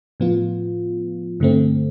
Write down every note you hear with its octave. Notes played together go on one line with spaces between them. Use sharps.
A2 F3 B3 F4
G2 D3 A3 C4